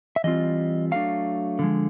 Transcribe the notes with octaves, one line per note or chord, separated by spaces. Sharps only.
E5
E3 G3 C4 F4 D#5
F#3 A3 D4 F5
D3 F3 G#3